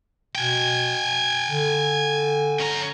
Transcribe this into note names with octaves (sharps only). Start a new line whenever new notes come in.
B2 G5 G#5
D3
C#4 A#5